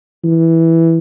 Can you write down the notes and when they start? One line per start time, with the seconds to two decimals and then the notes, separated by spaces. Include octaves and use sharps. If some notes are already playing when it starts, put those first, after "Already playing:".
0.24 E3